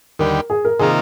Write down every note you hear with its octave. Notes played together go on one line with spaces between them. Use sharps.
D#2 D3 G3 A#4
G#4
A#4
C3 D#3 A#3 F4 G#4